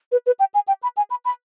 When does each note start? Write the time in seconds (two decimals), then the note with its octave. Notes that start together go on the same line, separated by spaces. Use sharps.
0.12 B4
0.26 B4
0.39 G5
0.54 G#5
0.68 G5
0.83 B5
0.97 G#5
1.10 B5
1.25 B5